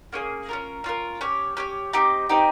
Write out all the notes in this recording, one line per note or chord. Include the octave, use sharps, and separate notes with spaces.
A#3 C#4 G#4
C#4 F4 A#4
C#4 F4 A#4
C#4 G4 C#5
C#4 G4 C#5
C4 D#4 G4
C4 D#4 G4